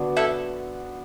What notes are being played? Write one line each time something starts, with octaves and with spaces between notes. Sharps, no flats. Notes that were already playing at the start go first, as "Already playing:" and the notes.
Already playing: D3 B3 D4 F#4
E4 A4